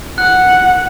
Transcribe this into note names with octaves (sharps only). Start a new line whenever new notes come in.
F#5 F#6